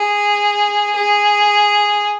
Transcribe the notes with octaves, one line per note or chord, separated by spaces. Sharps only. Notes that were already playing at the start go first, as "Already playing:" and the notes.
Already playing: G#4
G#4